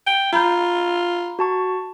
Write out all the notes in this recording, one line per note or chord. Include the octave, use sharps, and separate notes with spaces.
G5
F4 A#5 B5 G6
F#4 A5 C#6